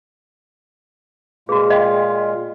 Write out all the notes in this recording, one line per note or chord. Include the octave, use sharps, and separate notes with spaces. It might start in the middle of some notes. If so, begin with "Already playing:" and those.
A#2 G#3 F4 F#4 G#4
D#5 F5 G5